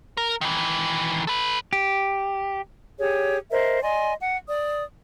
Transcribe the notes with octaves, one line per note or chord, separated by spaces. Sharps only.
A#4
D#3 E3
A4 B4
G4
G4 G#4 C#5
A#4 C5 D#5 E5
D5 D#5 G#5 C6
F#5
D5 D#6